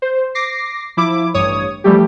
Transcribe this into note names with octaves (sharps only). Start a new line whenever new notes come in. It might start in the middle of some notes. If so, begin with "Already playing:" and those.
C5
D6 A#6 C7
F3 E4 D6
A1 G2 C#5 D#6
E3 F3 G3 A3 G4